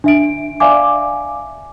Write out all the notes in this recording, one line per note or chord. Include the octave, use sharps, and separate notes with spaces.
D4 E5 D7
D5 E5 F5 G#5 D6